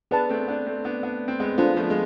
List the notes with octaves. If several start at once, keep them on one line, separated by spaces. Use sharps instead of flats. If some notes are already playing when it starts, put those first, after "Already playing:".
B3 D4 G#4 B4 D5 A5
A3 C4
B3 D4
A3 C4
B3 D4
B3 D4
C4
G#3 B3
G#3 B3 D4 F4 A4 C5
F3 A3
G#3